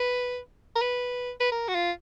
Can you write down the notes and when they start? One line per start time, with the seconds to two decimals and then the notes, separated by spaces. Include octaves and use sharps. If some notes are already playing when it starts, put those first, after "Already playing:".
Already playing: B4
0.76 A#4
0.81 B4
1.40 B4
1.52 A#4
1.68 F#4
1.75 F4